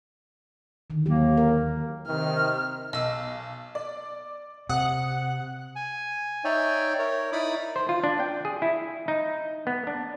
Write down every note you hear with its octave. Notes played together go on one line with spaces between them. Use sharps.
D3 D#3
D#2 F#3 A#3 G4
A#4
C3 D#3 F6
B1 D#5 E6
D5
C3 F#5 D#6
G#5
D#4 C#5 D5 E5 G5
A#4 C#5
D#4 E4 D5 B5 D6 D#6
C5
F4
D4
G5
G#4
E4
D#4
B3
D4